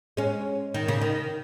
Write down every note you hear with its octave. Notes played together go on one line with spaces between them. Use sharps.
G#3 C#4
D#3
C#3
D#3